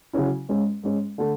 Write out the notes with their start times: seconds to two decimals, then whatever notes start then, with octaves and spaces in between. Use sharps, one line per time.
0.13 C#3 F#3 C#4 E4
0.49 G#2 G#3 C#4
0.83 G#2 G#3 C#4
1.18 D3 A3